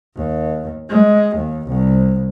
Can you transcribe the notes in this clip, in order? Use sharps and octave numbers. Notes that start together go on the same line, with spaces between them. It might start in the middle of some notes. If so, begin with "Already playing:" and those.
D#2
G#3
D#2
C2